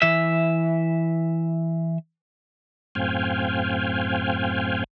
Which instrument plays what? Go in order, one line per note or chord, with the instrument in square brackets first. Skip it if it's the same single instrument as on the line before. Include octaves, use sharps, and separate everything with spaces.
[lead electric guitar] E3 E5
[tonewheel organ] F#2 A2 C4 F5 G5 G#5